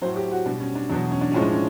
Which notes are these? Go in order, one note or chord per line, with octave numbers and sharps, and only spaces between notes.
A2 F#3 C5
G4
F#4
B2 G3 D4
C#4
D4
E2 B2 F#3 D4
C#4
D4
A2 F3 G#3 C#4
D4
C#4